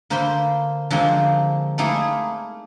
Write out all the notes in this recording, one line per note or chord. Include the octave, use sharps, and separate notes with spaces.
D3 A#3 A#4 C5 B5 C6
D3 F3 G#3 A#3 C4
A3 A#3 D#4 E4 G#4 A#4